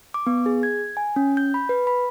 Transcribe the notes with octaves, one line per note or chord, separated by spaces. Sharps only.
D6
B3
G#4
G#6
G#5
C#4
G6
B5
B4
B5